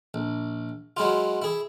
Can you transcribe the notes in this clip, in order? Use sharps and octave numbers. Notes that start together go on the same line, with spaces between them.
A#1
F#3 G#3 E4 F4
E4 G#4